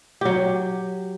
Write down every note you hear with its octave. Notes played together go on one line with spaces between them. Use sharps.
F#3 G4